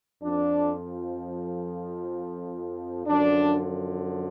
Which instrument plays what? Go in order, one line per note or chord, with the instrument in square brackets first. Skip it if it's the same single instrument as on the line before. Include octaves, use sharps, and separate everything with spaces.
[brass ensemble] F2 F3 D4
F#2 D3 F3 D4